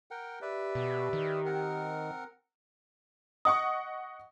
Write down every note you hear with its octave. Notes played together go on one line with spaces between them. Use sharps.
A#4 F#5 G5
G4 B4 D5 E5
B2
D#3
C4 A#4 F#5
D#5 F#5 C#6 D#6